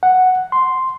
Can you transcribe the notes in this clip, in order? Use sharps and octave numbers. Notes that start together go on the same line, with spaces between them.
F#5
C6